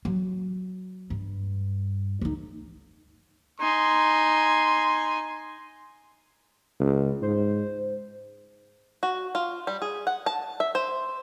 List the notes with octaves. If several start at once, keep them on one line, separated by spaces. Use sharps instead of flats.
F#3
G2
D2 D#4
D#4 G#5 C6
C#2
G#2 C5
F#4
F4
G3
G#4
F#5
A5
E5
C5